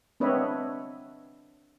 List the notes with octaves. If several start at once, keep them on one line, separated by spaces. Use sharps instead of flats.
C4 D4 B4 C#5 D#5 E5